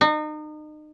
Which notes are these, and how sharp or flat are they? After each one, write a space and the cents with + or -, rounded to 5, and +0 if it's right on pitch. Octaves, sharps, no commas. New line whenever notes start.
D#4 -35